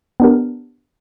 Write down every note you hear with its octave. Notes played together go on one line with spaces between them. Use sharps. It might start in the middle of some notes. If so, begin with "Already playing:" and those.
B3 D4 G4 A#4